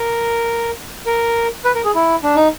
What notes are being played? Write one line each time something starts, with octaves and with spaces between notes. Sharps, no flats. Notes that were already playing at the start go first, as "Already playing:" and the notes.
Already playing: A#4
A#4
B4
A#4
G#4
E4
D4
D#4